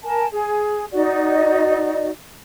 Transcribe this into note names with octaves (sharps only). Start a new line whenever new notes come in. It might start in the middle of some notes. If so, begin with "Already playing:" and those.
A#4 G#5 A5
G#4
D#4 F#4 D5 D#5